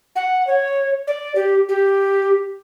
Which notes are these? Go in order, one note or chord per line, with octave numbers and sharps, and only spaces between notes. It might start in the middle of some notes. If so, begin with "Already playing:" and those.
F#5
C#5
D5
G4
G4